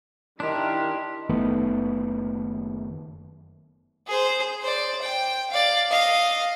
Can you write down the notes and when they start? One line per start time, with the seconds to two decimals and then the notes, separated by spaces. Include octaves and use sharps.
0.40 D#3 D4 E4 G4 A#4 D#5 C6
1.29 F#1 D#3 A3 B3
4.07 G#4 C5
4.62 C5 D5
5.02 G5
5.50 D5 F5
5.91 D#5 F5